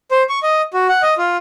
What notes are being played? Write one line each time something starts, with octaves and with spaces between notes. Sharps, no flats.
C5
C#6
D#5
F#4
F#5
D#5
F4